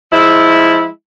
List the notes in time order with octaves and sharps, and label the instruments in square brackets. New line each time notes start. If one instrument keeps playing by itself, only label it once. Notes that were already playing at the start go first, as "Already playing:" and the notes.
[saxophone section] F3 G#3 E4